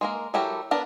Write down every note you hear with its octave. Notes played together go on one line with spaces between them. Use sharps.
G#3 A#3 A#4
F#3 E4 G4 A4 A#4
B3 D4 A#4 B4 A5